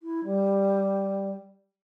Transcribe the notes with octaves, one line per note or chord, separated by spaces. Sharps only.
E4
G3